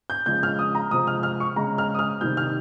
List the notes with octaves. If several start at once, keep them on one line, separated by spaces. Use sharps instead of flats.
G6
C#3 F3 G#3 G6
F6
D#6
A#5
C3 F3 G#3 D#6
F6
F6
C#6
C#3 G#3 A#5
F6
D#6
F6
C3 D#3 G3 G6
F6